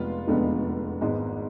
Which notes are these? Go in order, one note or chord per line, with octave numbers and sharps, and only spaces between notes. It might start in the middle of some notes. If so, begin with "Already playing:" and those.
Already playing: F1 G#3 B3 F4
F1 E2 D3 G#3 B3
G#1 G#2 G#3 B3